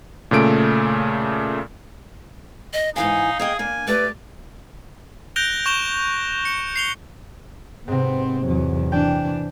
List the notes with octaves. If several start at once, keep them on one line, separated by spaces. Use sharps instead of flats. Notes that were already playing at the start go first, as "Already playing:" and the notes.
A#2 C#3 A3 D7
D#5
G#2 E3 D#4 F5 G#5
A#3 G#4 D#5 G5
A#3 D4 G#5
A3 G4 B4 D5
F#6 G6 A#6 D7 F7 G7
C#6 G6 E7 F7 G7
C#7
C7 F7 G7
G#2 C3 B3 C4
E2 F#3
E3 D4 G5